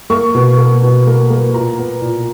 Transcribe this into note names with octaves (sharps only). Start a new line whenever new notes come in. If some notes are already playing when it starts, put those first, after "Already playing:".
A#3 C#6
B2
A#3
B2
A#3
A#3
A#2 A#5
B3
A#2